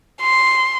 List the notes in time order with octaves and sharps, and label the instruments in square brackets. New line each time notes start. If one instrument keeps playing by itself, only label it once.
[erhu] C6